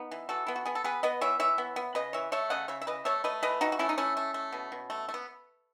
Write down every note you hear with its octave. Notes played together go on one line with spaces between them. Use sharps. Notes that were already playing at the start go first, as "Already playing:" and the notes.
Already playing: B3 D#4
E3
E3 F#4 A4
B3 E4
F#4
B3 G#4
A4
B3 G#4 B4
B3 B4 D#5
E3 C#5 E5
E3 C#5 E5
B3
B3
C#3 B4 D#5
E3 C#5 E5
A3 C#5 E5
C#3 D#5 F#5
C#3 C#5 E5
E5
E3 B4 D#5
A3 C#5 E5
A3 B4 D#5
E3 B4 D#5
E3 D#4 F#4
F#4
A3 C#4 E4
D#4
A3 C#4 E4
A3
A3
B2
B2
A3
A3
B3